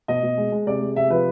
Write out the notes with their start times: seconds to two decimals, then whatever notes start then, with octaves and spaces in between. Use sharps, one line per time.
0.08 B2 D#5
0.23 B2
0.38 G#3
0.52 G#3
0.67 C3 D5
0.81 G#3
0.96 C3 E5
1.10 F3 B4